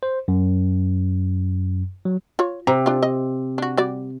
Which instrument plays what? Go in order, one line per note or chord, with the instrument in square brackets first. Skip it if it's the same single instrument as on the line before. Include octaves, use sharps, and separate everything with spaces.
[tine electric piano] C5
F#2
F#3
[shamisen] F4 C#5
[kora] C3 [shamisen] A#5
[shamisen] D4 F4
D#5
D4 F#4
G3 F#4 D5